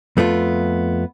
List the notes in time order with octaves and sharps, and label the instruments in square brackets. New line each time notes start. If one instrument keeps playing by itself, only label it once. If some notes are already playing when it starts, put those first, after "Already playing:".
[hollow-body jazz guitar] F2 A3 B3 E4 F4